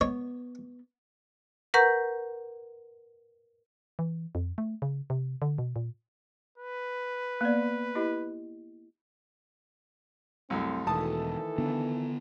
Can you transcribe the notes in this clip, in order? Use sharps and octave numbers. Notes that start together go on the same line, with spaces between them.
B3 C#5
A#4 B4 F#5 A#5 C#6 G6
E3
F2
A3
C#3
C3
D3
B2
A#2
B4
A#3 B3 D5
E4 G4 D#5
C2 F#2 A3 C4
E1 D#3 E3 A3 A4 A5 D#6
D3 B3 D4